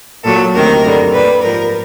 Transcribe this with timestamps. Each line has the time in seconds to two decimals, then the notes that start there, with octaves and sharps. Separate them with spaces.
0.24 A#2 F#3 A4
0.53 D2 C3 D#3 A#4
0.83 F#2 D3 G3
1.12 A#2 G3 B4
1.41 G#2 F3 A#4